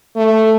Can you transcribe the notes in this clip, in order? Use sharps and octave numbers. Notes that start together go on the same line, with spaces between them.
A3